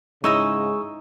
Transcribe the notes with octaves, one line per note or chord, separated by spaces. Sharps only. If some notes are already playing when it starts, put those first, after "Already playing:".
G#2 C#3 G#3 D#4 E4 D#5 C#6 E6